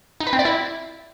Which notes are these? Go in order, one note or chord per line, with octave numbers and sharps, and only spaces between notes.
D#4
B4
C4
D5
E4